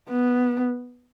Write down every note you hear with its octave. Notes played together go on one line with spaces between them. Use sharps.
B3